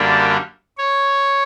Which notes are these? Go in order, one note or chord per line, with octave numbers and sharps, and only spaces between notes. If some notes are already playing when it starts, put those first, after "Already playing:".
Already playing: F#2 D3 G3 A#3 D4 A4
C#5